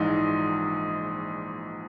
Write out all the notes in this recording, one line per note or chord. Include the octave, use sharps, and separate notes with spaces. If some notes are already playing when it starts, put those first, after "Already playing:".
Already playing: A#1 G#2 E3 D#4